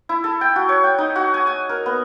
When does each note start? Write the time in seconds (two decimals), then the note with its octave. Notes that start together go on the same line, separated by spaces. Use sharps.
0.09 E4
0.24 A4
0.41 G5
0.56 F#4
0.69 C#5
0.84 G5
0.98 D#4
1.16 F#4
1.34 G#5
1.47 G#5
1.69 A#4
1.86 B3